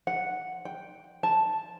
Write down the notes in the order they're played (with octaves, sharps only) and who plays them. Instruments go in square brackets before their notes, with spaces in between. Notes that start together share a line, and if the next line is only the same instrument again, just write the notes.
[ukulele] F#5
G5
A5